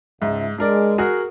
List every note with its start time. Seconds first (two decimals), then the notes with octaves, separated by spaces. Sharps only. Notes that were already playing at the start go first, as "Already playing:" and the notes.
0.22 C#2 G#2 E5
0.58 G#3 D4 A#4 D5
0.98 F#4 G#4 A#4